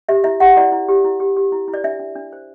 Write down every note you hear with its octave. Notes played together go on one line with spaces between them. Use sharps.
G4 E5
E4 E5
G4 F#5
E4 D5
E4
G4
E4
G4
G4
E4
E4
D5
D4 E5
D4
D4
C5